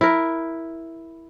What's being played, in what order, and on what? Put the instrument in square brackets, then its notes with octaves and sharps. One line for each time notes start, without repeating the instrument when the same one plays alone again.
[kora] E4 A#4